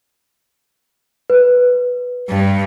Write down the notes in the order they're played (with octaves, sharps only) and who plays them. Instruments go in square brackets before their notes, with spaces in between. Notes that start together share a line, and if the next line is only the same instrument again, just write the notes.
[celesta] B4
[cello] G2